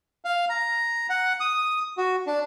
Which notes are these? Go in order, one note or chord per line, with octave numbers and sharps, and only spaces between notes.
F5
A#5
F#5
D#6
F#4
D4